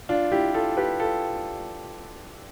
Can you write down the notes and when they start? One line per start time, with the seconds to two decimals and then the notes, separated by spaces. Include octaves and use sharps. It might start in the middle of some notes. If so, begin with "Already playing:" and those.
0.09 D4 F4
0.32 E4 G4
0.54 F4 A4
0.77 G4 B4
0.99 F4 A4